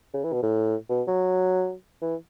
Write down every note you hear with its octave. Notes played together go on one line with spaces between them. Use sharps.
C#3
E3
B2
A2
B2
F#3
E3